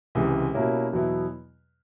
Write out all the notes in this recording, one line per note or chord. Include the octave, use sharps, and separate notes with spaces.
C#2 C3 E3 G#3
B2 G3 A#3 C#4 E4
E2 B2 F#3 B3 E4